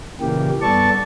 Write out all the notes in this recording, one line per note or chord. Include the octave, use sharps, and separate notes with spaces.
A#2 C#3 E3 A#3 G4
G2 B3 A4 D5 A5 C#6